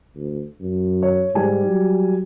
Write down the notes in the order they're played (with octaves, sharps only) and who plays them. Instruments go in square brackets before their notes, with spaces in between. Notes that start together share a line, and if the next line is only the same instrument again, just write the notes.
[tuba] D2
F#2
[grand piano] C#5
[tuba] G#2 [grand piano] G3 G4 G#5
[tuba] F#3